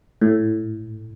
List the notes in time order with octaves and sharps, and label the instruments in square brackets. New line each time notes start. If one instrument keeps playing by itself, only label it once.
[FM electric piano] A2